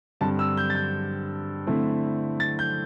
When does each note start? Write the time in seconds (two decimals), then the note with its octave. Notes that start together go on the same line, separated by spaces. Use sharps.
0.21 G2 D3 C4 A5
0.39 E6
0.57 G6
0.70 A6
0.75 G6
1.67 D3 A3 C4 E4
2.40 A6
2.59 G6